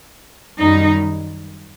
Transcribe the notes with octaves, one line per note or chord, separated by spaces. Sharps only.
F#2 D#3 G3 D#4